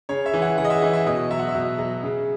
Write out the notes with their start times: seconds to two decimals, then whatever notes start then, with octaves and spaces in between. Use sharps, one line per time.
0.09 C#3 C#5
0.26 E5
0.34 E3
0.42 F#5
0.58 C#3 F#5
0.64 D#5
0.70 E5
0.82 E3 F#5
0.93 E5
1.06 B2 D#5
1.31 F#3 E5
1.39 F#5
1.49 E5
1.55 B2
1.79 F#3
2.03 C#3